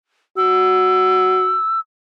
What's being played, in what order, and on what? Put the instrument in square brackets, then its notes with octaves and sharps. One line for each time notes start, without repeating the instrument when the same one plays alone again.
[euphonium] F#4 [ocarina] E6